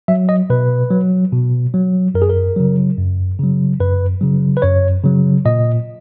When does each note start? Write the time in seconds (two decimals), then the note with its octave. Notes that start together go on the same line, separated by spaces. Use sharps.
0.08 F#3 E5
0.29 D#5
0.50 B2 B4
0.91 F#3
1.32 B2
1.74 F#3
2.14 F#2 A#4
2.22 G#4
2.30 A#4
2.56 C#3 F#3
2.97 F#2
3.39 C#3 F#3
3.80 F#2 B4
4.21 C#3 F#3
4.57 B4
4.62 F#2 C#5
5.04 C#3 F#3
5.45 A#2 D#5